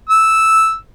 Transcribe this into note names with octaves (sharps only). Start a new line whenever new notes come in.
E6